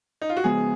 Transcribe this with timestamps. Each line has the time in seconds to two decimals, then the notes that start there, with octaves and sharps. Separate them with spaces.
0.22 D#4
0.29 F4
0.37 F#4
0.44 C#3 F3 G#3 B3 G#4